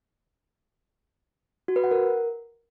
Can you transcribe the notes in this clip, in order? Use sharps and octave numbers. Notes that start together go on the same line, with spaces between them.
F#4
B4
F#5
A#4